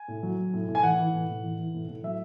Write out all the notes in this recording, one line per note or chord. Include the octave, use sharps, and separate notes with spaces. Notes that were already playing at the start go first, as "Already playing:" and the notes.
Already playing: G#5
A2
F#3
F#3
A2
A2
G#5
E3 F#5
E3
A2
A2
E3
E3
A2
A2
F#3 E5